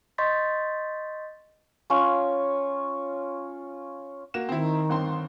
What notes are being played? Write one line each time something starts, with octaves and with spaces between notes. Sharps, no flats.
D#5 C6 C#6 G6 A6 B6
C#4 F4 C#5
A#3 F#4 E7
D#3 C4 E4
G1 C4 C6